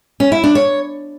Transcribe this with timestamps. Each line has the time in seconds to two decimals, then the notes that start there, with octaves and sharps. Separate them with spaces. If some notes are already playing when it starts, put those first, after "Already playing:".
0.20 C#4
0.32 E4
0.44 D4
0.55 C#5